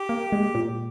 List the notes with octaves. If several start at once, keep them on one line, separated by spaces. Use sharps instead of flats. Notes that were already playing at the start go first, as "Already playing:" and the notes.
Already playing: G4
A#3
G#3
A#2